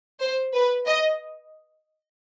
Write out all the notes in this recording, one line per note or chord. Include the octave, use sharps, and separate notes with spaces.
C5
B4
D#5